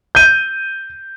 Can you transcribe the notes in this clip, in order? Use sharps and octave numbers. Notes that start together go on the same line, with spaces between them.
G6 D#7